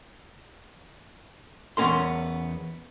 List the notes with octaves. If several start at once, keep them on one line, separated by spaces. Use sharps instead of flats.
E2 B3 C#4 A#4 C6